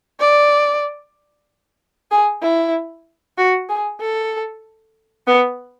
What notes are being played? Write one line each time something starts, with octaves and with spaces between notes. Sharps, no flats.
D5
G#4
E4
F#4
G#4
A4
B3